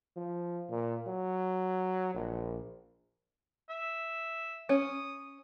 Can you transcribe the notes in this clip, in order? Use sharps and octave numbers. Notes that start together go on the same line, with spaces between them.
F3
A#2
F#3
A#1
E5
C#4 D#6